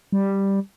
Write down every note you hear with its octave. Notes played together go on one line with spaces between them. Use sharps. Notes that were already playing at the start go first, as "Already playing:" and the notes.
G3